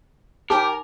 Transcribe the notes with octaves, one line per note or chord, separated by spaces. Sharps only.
D#4 G4 A#4 G#5 D6